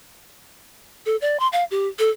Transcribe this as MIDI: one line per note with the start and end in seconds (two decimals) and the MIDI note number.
1.06 1.16 69
1.21 1.39 74
1.40 1.48 84
1.53 1.64 77
1.71 1.88 67
1.99 2.10 69